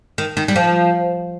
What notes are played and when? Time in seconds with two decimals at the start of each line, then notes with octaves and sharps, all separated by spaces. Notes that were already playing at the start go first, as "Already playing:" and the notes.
0.18 D#3
0.37 D#3
0.48 G3
0.56 F3